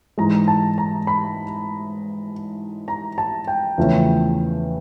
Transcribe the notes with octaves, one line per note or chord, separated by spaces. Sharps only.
G#2 E3 G#3 A#5
A5
A#5
B5
A#5
A5
G5
E2 C#3 F3 A3 C#4